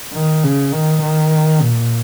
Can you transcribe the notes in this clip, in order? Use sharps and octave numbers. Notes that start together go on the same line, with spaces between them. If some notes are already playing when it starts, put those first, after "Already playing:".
D#3
C#3
D#3
D#3
A#2